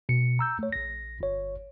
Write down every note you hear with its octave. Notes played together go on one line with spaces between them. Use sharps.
B2 C#7
A#5 E6 G6
A3 C#5
A#1 A#6
G1 C#5